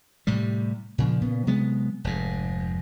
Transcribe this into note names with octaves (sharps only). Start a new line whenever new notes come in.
A2 C3 G3
A#2 C#3 F3
A#2 C#3 B3
C3 F#3 G#3 B3
F1 G#2